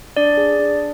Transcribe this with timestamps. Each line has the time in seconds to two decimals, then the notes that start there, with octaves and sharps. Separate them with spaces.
0.17 D4 D5
0.37 G#4
0.59 D4